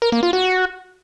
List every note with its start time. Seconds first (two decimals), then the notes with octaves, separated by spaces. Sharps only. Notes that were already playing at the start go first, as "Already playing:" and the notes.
0.02 A#4
0.12 A#3
0.23 F4
0.33 F#4